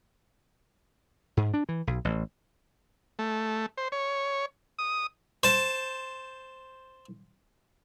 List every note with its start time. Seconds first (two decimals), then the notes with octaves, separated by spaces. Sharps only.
1.37 G#2
1.54 D4
1.69 E3
1.87 B1
2.05 A1
3.19 A3
3.77 C5
3.92 C#5
4.79 D#6
5.43 C5 A5